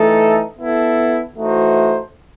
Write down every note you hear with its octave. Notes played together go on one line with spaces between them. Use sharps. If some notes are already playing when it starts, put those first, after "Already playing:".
Already playing: E3 A3 D#4 A4
B3 E4 A4
E3 A3 D#4 F#4 C5